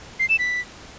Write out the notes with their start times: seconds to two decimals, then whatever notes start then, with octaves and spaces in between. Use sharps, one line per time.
0.20 C7
0.29 E7
0.39 B6